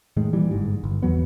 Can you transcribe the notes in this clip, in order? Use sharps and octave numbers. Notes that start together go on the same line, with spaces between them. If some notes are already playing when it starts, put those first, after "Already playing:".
A2 D#3 G#3
A#2 E3 G3
G1 G#2
G1
E2 F#3 B3